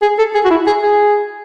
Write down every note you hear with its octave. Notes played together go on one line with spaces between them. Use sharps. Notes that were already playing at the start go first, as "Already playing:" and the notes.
G#4
A4
G#4
F#4
E4
G#4
G#4